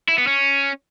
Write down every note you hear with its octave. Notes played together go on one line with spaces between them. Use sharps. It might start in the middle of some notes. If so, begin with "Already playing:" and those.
E4
B3
C#4